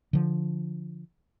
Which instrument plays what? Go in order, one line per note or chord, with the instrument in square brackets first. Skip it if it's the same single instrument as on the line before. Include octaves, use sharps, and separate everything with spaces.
[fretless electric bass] D3 F3